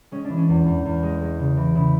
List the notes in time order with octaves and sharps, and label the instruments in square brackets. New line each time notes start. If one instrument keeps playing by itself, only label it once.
[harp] G#3 C#4
E3 D4
C#4
E2
E2
E2
G#3
G#3
C#3
E3
C#3 E4